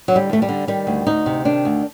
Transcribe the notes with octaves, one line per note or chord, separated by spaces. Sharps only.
D3 F#3
G3
D#2 A3
G3
D3
D#3 G3
D2
D2 D#4
C3
D#3 D4
D2